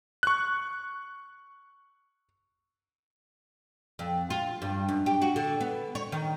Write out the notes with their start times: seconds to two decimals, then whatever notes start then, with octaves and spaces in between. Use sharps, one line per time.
0.23 C#6 F#6
3.99 F2
4.30 F4
4.62 G2
4.89 F#2
5.06 G4
5.22 F#4
5.36 D3
5.60 B3
5.95 C#5
6.12 D#3